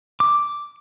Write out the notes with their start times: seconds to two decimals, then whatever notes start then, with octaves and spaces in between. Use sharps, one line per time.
0.20 D6